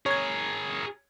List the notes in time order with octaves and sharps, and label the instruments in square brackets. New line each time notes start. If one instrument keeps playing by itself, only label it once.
[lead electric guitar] G#4 A#4 [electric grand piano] C#5 G#6